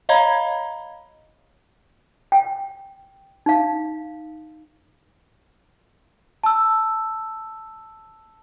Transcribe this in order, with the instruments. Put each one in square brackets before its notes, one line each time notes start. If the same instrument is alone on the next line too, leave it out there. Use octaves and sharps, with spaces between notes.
[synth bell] C#5 D#5 F5 A#5 B5 G#6
[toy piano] G5
D#4 F5
[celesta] A5 E6